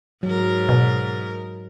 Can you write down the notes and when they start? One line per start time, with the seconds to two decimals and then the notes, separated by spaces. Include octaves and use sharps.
0.23 G#2 F#3 A#4
0.69 B2